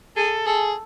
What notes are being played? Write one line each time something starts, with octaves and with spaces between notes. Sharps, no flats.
G#4 A4
G#4 A4